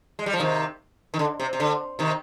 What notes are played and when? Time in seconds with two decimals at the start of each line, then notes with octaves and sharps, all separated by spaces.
0.19 G#3
0.26 G3
0.33 F3
0.40 C3 D#3
1.14 D#3
1.19 D3
1.40 C3
1.53 C3
1.60 D3
1.99 C3 D#3